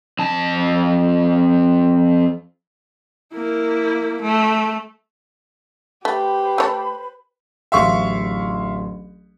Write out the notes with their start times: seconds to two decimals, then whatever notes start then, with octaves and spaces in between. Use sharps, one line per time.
0.19 F2 A5
3.33 A#3 E4
4.22 A3
6.05 A3 G4 B4 C5 B5
6.58 A3 C#5 A5
7.72 D1 A1 E5 F5 C6 C#6